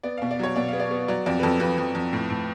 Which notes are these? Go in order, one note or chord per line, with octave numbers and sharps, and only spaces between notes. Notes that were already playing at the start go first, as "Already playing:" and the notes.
B3 D5
B2 F5
D5
F#3 C#5
B2 D5
B3 F5
D5
B3
F#3 D5
F2 D5
B4
F2 A4
F2 B4
F2
F2
A2
A2